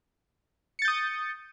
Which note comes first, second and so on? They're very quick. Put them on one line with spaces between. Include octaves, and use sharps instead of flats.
C#7 A6 G6 D#6